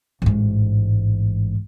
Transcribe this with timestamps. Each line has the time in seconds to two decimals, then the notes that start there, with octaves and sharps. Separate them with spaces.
0.22 A1 G#2